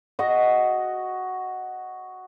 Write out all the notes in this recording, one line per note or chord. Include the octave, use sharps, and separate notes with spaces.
F#4 D#5 F#5